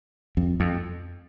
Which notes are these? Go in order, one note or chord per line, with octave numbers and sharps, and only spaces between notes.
F2
F2